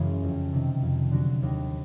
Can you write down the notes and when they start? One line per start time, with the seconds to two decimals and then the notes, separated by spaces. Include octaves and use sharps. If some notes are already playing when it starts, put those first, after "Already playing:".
Already playing: F#2 C#3 E3 G#3
0.23 F2
0.53 C3 D#3
0.82 F2
1.11 D3 F#3
1.42 D#2